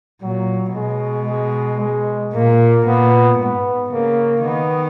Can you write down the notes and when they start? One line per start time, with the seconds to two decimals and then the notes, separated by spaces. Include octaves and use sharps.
0.22 A#2 F#3
0.75 B2 G#3
1.28 G#3
1.80 G#3
2.34 A#2 A#3
2.87 A#2 B3
3.40 G#2 B3
3.92 C#3 A#3
4.45 D#3 B3